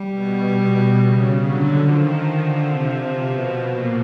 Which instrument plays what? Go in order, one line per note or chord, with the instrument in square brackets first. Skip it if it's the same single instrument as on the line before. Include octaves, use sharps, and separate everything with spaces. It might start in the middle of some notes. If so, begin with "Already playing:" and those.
Already playing: [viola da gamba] G3
[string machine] B2
B2
C#3
[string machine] D3 [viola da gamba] F#3
[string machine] D#3 [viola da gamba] F3
[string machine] D3
C3
C3
B2
A#2